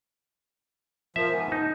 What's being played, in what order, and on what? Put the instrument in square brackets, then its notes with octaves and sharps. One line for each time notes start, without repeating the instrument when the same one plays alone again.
[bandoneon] F3 [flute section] A#4 [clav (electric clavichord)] E5
[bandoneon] G#2 B3 [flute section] G#5
[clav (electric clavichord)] D#4 [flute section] A5